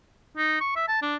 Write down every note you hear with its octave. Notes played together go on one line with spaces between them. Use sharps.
D#4
C#6
E5
A5
D4